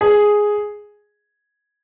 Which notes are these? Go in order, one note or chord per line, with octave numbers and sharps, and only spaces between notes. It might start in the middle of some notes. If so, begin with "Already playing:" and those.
G#4